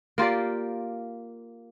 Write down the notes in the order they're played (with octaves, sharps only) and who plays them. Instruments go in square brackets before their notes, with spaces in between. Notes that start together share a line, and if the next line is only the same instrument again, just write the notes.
[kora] A#3 F4 G4 D5